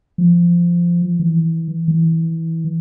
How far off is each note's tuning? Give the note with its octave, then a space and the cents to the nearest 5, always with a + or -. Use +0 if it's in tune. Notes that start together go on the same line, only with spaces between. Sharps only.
F3 -15
E3 -15
E3 -15